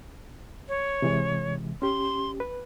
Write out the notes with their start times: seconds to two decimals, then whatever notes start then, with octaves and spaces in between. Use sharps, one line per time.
0.68 C#5
1.02 C3 E3 G#3
1.82 C#4 G4 C6
2.40 B4